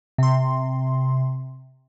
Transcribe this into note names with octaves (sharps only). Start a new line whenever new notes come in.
C3 C6